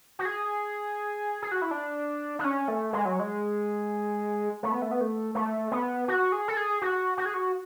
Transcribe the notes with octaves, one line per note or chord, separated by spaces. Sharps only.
F#4
G#4
G#4
F#4
E4
D4
D4
C#4
A3
G#3
F#3
G#3
A3
B3
A3
B3
A3
A3
B3
F#4
G#4
A4
G#4
F#4
F#4
G#4
F#4